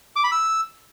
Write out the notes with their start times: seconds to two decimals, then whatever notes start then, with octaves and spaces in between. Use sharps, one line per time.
0.16 D6
0.24 B5
0.32 E6